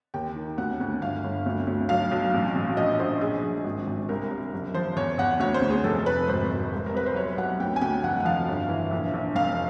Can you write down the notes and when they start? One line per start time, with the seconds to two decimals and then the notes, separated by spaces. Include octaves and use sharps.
0.14 D#2 G5
0.36 D#3
0.58 D2 F#5
0.80 D2
1.01 G1 F5
1.24 G1
1.46 D2
1.67 D2
1.89 B1 F5
2.11 B1
2.34 A1
2.55 A1
2.77 A#1 D#5
2.99 A#1 C5
3.21 A#1 G#4
3.43 A#1
3.64 G#1
3.87 G#1
4.09 C2 A#4
4.31 C2
4.53 F#1
4.74 F3 C5
4.96 E2 C#5
5.18 E2 F#5
5.40 D2 C#5
5.54 C5
5.62 D2
5.70 G#4
5.84 F1 A4
6.06 F1 B4
6.28 G#1 C5
6.50 G#1
6.72 C2
6.86 A#4
6.94 C2 B4
7.06 C5
7.16 B1 C#5
7.37 B1 F#5
7.60 D2 G5
7.76 G#5
7.81 D2 G5
8.03 F1 F#5
8.20 F#5
8.25 F3 F5
8.48 G1
8.69 E3
8.91 A#1
9.14 A#1
9.35 F1 F5